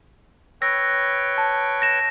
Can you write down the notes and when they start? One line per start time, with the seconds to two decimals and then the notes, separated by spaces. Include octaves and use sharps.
0.62 B4 C#5 G5 E6 A#6
1.38 A5
1.81 G6 A#6 E7